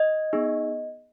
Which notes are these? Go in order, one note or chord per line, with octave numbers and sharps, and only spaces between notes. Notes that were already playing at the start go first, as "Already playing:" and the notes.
Already playing: D#5
B3 D#4 G#4